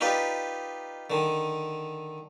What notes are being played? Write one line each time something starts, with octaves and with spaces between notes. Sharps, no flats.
D#4 F4 G4 B4 D5
D3 D#3